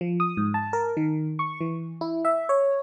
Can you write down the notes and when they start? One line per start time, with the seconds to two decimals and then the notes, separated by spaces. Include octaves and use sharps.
0.01 F3
0.20 D#6
0.37 G#2
0.54 A5
0.73 A#4
0.97 D#3
1.39 C#6
1.61 E3
2.01 E4
2.25 E5
2.49 C#5